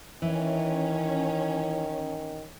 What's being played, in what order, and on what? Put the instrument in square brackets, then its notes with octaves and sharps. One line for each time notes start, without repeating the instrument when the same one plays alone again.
[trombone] D#3 [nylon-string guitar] E3 [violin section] C#4